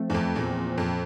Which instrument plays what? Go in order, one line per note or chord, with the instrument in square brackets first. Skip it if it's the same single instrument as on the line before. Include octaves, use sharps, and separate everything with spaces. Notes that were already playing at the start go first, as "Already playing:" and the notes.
Already playing: [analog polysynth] F3 A3 C4
[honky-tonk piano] E2
F2
[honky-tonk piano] E2 [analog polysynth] A#2 F3 C4
[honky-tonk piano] F2